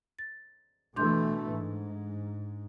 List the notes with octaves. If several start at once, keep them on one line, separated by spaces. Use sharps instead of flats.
A6
B2 E3 A3 D4 C6 G6
G#2